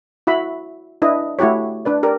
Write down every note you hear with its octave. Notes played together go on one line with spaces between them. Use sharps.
E4 F#4 E5 B5
D4 E4 B4 D#5
A3 E4 F#4 G4 C#5
D4 B4 D5
G4 A#4 D5